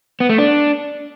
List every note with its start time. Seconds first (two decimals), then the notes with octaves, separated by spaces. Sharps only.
0.20 B3
0.29 A3
0.38 D4